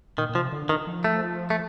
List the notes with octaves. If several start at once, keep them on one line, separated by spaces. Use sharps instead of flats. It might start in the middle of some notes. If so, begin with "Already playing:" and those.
A#2 D#3
A#2
C3 F3
D3
D#3
F3
A3
A3